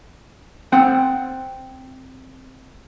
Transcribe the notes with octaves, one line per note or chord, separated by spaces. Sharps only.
C4 F#5 G5